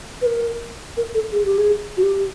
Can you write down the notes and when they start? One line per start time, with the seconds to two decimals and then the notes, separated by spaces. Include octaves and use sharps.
0.22 B4
0.26 A#4
0.97 A#4
1.14 A4
1.32 G#4
1.45 G4
1.58 G#4
1.97 F#4
2.03 G4